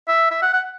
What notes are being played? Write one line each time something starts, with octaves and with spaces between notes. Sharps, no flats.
E5
E5
F#5
F#5